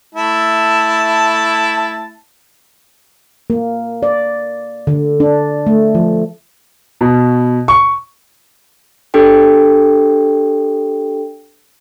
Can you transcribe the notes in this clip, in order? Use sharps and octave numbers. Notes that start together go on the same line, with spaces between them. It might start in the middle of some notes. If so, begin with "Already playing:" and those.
A3 E4 A5
A#3
D5
D3
D4
A3
F3
B2
C#6
D4 G4 A4 G5